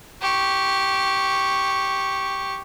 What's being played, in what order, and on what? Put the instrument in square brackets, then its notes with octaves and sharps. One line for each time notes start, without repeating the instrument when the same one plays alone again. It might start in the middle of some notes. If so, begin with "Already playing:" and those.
[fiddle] G4 C#6